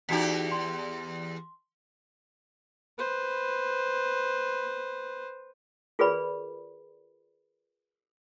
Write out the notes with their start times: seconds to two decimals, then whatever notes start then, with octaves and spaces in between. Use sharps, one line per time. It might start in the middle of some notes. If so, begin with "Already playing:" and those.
0.09 E2 D#4 F#4 G4 B6
0.51 C6
2.98 B4 C5
5.99 F4 G#4 A#4 B4 D5 B5